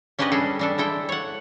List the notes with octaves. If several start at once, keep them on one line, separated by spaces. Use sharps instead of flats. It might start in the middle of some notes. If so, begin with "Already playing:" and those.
C#4 D4 G4 B4 D5 D#5
G3 G#4 A4
G3 D4 A4
G#3 E4 A4 G5
C#5 F#5